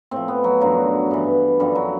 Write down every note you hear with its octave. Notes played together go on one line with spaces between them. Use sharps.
A2 F3 C4
B3
F#3
F#2 D3 F3 F#3
G2 E3
F#2 D3 F3 G3
F#3